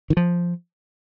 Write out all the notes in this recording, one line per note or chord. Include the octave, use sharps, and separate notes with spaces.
D#3
F3